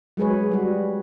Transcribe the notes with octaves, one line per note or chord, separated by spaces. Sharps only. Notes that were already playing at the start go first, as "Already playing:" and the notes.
F#3 G#3 G#4 B4 C#5
G3 F#4